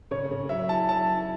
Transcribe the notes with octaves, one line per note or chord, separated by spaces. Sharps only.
C#3 C#5
C#3
F#3 E5
E4 A5
F#3 A5
E4